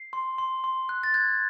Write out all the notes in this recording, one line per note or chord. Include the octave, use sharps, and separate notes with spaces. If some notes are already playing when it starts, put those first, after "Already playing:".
Already playing: C7
C6
C6
C6
F#6
A6
F#6 G#6